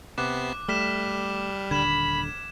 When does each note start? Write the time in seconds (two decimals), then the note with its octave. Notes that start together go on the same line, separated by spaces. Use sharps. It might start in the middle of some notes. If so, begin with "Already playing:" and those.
0.18 C3 B3 D6 F#6 C7
0.68 G3 A3 F6 B6 E7
1.71 D#1 D3 B5 G#6 E7